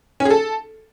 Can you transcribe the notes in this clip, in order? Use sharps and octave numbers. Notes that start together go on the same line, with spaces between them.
C#4
G#4
A4